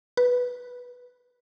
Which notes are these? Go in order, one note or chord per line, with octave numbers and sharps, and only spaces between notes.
B4